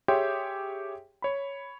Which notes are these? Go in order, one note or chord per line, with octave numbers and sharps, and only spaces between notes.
G4 G#4 C#5 E5 G5 C6
C#5 B5